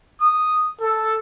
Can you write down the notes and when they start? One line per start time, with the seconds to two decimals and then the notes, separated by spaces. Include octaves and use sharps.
0.21 D#6
0.81 A4